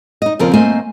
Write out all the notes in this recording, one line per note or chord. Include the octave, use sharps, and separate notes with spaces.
D#4 D#5
D#2 C#3 F3 C4 F4 A#4
A3 A#3 C4 C5 D#5 G#5